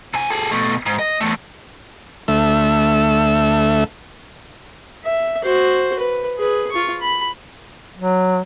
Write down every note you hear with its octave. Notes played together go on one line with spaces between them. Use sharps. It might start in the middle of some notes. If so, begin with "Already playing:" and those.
C3 G#5
G#4 A4
B2 A3
G#2
D#5
E2 A3
D2 A3 E5
E5
F#4 C5
B4
G#4 B4
F4 C#6
B5
F#3